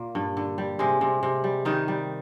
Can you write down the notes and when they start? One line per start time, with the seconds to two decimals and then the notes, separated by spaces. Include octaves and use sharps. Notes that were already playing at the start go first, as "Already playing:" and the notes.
Already playing: A#2 A#3
0.15 G2
0.37 D3
0.58 G3
0.79 C3 G#3
1.01 C3
1.23 C3
1.44 G3
1.65 D#3 G3 D#4
1.88 G3